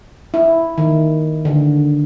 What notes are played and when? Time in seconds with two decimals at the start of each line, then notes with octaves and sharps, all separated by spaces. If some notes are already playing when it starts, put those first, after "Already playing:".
0.34 E4
0.78 D#3
1.45 D3